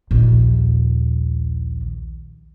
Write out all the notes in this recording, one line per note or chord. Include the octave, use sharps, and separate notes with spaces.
A#1 D#2